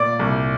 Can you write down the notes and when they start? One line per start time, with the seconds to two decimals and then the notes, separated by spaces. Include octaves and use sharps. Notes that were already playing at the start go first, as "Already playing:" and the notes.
Already playing: A#2 D5 D6
0.19 C2